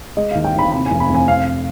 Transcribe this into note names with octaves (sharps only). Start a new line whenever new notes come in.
G#3 D#5
D#2 F5
G5
D#2 B5
C3 B5
F1 G#5
B5
F1
G#5
C4 F5